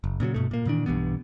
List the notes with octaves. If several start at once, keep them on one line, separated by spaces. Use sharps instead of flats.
F#1
A#2 C#3 E3 F#3
G2 B2 A3
A#2 A#3
A#2 D#3 E3 D4
B1 G2 E3 B3